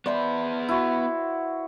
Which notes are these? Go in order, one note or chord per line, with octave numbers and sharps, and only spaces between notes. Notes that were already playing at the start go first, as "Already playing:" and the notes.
B3 B4 C5 D5 E5
E4 F#4